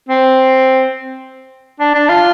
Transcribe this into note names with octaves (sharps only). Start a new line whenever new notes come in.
C4
D4
D4
F4